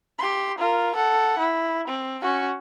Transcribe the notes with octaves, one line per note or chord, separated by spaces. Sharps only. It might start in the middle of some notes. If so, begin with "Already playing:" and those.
G4 C6
F4 A#4
A4 F#5
E4
C4
C#4 F#4